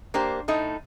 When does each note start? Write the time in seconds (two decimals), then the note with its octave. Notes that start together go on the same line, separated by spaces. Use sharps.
0.14 A#3 D4 G4 C5
0.48 A2 A3 D#4